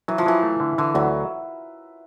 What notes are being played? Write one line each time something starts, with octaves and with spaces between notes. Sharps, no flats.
E3 F#3
F3
E3 F#3
A3
D3
D3 E3
D2 F#3